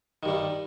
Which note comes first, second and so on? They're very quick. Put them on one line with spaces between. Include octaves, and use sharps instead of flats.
D#3 G2 G3